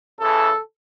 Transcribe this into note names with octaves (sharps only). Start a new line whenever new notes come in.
C#3 E3 A4